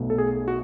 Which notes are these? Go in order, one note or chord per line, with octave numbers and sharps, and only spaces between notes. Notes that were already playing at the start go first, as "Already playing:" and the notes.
Already playing: B1 B2 F#3 A3
A4
G#4
F#4